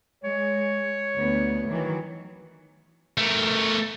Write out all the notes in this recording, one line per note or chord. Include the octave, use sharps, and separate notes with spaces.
G#3 C#5
D2 B3
D#3 E3 F#3
A3 A#4